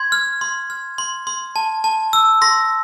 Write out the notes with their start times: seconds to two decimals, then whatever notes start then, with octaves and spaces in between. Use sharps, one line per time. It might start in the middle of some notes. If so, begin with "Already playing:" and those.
Already playing: C6 G#6
0.12 F6
0.41 C6
0.70 F6
0.98 C6
1.27 C6
1.56 A5
1.84 A5
2.13 E6
2.42 C6 A#6